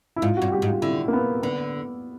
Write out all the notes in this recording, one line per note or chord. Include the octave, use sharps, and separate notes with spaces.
E4
G#2 F4
G2 F#4
G4
G#2
F4
D3 E4
A#3
B3
D3 B3